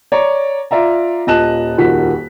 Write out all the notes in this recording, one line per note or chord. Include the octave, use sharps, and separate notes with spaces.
C#5 D5 A#5
F4 D5 E5 A#5
D#1 A#2 D#5 A5 F#6 E7
D#1 F2 D#3 F#4 B6